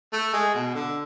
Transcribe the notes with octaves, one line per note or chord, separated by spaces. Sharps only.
A3
G#3
B2
D3